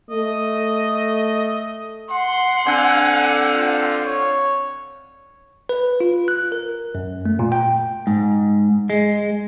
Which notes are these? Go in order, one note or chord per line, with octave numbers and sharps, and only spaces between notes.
A3 D#5
F#5 C6
D3 C4 G#5
F4
C#5
B4
F4
F#6
A#4
F#2
A3
A#2
G5
G#2
G#3